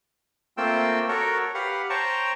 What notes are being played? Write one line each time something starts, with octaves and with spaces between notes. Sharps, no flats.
A3 A#3 C4 F4 G5 E6
F#4 A4 A#4 C#5
G4 B4 F5 F#5
C5 C#5 G5 A5 A#5 C#6